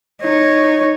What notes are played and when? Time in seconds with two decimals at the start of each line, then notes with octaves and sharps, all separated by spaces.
0.22 D#4 C#5